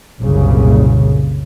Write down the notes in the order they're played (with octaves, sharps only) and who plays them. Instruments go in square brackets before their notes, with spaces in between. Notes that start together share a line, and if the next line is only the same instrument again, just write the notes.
[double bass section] F#1 C2 A#2 C#3